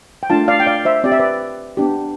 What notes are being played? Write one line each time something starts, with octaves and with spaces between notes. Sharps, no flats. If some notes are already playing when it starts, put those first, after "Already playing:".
G5
A3 D4 F4 F5 A5
D5 F5
G5
D5 F5
C5 E5
C4 G4 D5
E5
B4 D5
B3 D4 G4